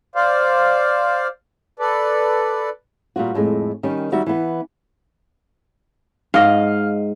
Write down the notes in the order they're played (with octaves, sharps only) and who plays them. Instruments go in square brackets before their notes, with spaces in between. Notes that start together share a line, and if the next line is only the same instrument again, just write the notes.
[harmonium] C5 D5 F5
A4 B4 D5
[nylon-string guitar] A#2 G3 F4 F#4
F2 A2 G#3
D#3 G3 C#4
D#3 G3 F#4 E5
E3 B3
[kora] G#2 D#5 [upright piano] F5